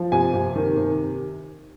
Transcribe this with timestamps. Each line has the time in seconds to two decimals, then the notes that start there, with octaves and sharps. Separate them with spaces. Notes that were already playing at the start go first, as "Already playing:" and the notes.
Already playing: F3
0.12 C3 G#5
0.34 C3
0.56 D#3
0.77 C3